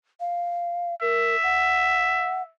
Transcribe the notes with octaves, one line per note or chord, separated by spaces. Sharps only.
F5
A#4 E5
F#5